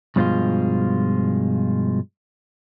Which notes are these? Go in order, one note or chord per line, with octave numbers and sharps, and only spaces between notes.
G2 B2 F3 G3 G#3 F4